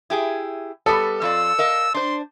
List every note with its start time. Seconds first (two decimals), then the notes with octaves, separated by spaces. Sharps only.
0.10 E4 G4 G#4
0.86 G3 B3 A4
1.22 F2 F4 D5 E6
1.59 A#4 D#5 F5
1.94 D4 C5 C6